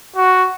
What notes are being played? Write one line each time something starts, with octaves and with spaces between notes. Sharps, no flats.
F#4